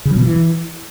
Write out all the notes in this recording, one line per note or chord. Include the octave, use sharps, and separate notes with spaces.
C#3
F#3
B2
F3
E3